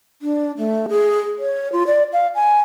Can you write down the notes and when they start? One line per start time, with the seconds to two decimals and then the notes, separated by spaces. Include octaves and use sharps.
0.22 D4
0.58 A3
0.89 G#4
1.39 C#5
1.72 F4
1.87 D5
2.13 F5
2.35 G#5